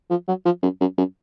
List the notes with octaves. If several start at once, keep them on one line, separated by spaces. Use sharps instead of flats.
F3
F#3
F3
F#2
F#2
F#2